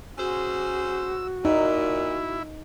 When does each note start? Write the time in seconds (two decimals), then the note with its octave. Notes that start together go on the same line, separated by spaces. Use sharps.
0.18 C#4 F#4 G#4 C5 E6
1.45 A#2 D#4 E4